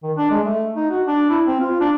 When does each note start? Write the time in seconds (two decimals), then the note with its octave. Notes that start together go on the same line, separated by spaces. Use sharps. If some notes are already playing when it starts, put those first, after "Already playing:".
0.03 D#3
0.17 D4
0.31 G#3
0.45 A3
0.76 D#4
0.90 F#4
1.07 D4
1.30 E4
1.46 C4
1.61 F4
1.81 D4